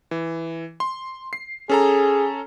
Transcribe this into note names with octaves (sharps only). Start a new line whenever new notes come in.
E3
C6
C7
C#4 G#4 A4 A#5